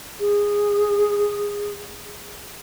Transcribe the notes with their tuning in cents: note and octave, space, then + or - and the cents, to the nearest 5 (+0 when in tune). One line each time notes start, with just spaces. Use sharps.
G#4 -15